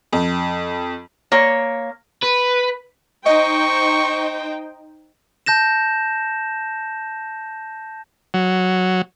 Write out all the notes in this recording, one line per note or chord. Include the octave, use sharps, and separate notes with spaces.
F2
A#3 C#5
B4
D#4 C5 D#5 G5 C#6
A5 G6 A#6 E7
F#3